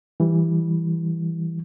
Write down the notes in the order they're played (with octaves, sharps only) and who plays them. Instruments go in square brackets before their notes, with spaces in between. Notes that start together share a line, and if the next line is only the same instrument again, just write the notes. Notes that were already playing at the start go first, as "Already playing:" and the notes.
[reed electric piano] E3 G3